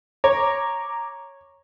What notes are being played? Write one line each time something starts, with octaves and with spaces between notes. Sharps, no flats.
C#5 A#5 D6